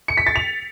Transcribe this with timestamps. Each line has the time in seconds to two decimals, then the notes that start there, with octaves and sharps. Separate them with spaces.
0.08 C#7
0.17 B6
0.27 A6
0.36 F7